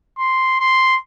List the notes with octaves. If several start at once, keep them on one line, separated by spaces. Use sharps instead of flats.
C6
C6